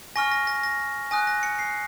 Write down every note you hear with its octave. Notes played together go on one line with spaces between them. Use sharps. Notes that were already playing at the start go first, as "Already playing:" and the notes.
G#5 C#6 F6 A#6
A#6
A#6
A#6
G#5 D#6 F#6 A#6
A#6
C#7
C7